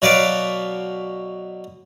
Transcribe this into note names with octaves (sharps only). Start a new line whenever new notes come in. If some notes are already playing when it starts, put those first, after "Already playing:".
B2 F#3 B4 D5 F5 D6